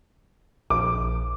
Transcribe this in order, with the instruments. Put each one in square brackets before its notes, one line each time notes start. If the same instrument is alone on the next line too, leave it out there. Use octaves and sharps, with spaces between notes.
[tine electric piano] A#1 [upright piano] D6